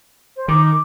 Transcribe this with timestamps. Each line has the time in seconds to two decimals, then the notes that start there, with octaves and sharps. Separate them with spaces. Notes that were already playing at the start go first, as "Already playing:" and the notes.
0.36 C5
0.48 D#3 D6